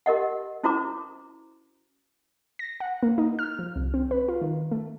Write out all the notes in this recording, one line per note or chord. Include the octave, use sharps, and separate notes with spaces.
G4 A#4 D#5 F#5
C#4 E4 F#4 C5 A#5 D6
A#6
F#5
A#3
D#4
F6
F3
C2
C4
B4
F4
D#3
A3